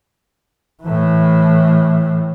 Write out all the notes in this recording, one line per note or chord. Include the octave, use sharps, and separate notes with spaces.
A2 E3